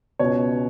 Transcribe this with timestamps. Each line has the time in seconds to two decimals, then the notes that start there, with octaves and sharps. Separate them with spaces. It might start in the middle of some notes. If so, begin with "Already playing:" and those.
0.19 C#2 B2 C#5